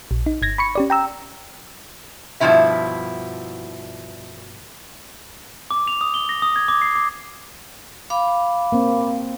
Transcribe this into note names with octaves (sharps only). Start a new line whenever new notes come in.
A#1
D#4
G1 G#6 A#6
B5 C#6 C#7
C#4 G4 D5
G5 A#5 E6
G2 B2 E3 F3 E4 E5
D6
F7
D#6
G7
A#6
D#6
G#6
D6
C7
D6
F5 B5 D6
A#3 C4